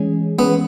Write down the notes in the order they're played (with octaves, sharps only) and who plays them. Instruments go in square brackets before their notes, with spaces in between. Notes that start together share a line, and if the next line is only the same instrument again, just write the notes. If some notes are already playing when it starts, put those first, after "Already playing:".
Already playing: [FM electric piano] E3 G#3 C#4 G#4
[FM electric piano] E3 G#3 C#4 G#4 [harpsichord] B3